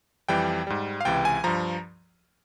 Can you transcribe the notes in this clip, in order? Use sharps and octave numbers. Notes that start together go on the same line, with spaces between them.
F2 E3 G3 G5
G#2 G3
F5
C#2 C3 E3 G5
G#5
G2 F3 A#5